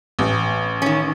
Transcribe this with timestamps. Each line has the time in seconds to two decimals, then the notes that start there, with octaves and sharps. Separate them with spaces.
0.19 A1
0.82 D#3 C#4